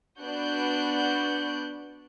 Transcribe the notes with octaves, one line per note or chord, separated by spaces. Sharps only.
B3 D4 F#4 D5 F#6 G6